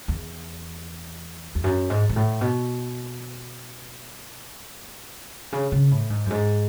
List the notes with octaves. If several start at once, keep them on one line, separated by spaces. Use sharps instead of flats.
E2
E2
F#2
G#2
G#2
A2
B2
C#3
C#3
A2
G#2
F#2
G#2